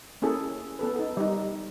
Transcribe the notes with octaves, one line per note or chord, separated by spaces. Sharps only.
A#3 C#4 E4 G#4 A4
B3 A4 B4
D#4 A4
G3 D#4